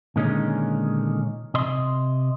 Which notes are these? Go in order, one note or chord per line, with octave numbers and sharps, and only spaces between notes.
A#2 D3 D#3 G#3 C#4 D#4
C3 D#5 C6